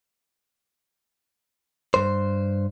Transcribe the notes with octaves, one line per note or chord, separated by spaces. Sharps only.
G2 C5